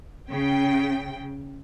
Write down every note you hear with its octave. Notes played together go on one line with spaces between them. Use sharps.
C#3 G5